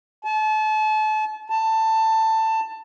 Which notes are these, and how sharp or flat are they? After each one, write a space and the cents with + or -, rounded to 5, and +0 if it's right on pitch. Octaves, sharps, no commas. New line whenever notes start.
A5 -35
A5 +15